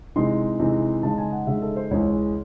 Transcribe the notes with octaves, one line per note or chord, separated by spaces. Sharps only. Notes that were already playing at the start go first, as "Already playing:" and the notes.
C3 E3 G#3 C4 D#4 C6
C3 E3 G#3 C4 D#4
C#3 G#3 D#4 A5
G#5
F#5
C#3 G#3 D#4 E5
A4
C5
C#2 C#3 E3 G#3 C#5